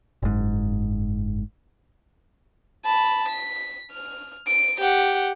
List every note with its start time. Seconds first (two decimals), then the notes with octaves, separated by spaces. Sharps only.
0.23 F#1 G#2
2.85 A5 B5
3.28 B6
3.92 F6
4.47 D7
4.80 G4 F#5